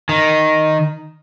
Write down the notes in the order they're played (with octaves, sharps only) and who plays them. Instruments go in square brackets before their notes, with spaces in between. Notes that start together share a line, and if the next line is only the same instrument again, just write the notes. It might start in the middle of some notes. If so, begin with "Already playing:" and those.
[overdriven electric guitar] D#3